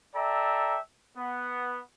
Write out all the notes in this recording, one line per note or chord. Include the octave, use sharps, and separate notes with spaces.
A4 D5 E5 G5 A#5
B3